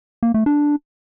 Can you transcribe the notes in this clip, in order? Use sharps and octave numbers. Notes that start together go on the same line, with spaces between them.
A#3
A3
D4